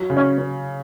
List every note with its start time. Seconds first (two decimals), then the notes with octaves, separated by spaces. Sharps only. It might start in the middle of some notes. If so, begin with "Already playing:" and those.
Already playing: F#3
0.10 C#3
0.17 C#4